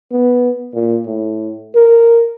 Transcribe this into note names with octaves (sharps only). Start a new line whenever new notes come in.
B3
A#2
A2
A#4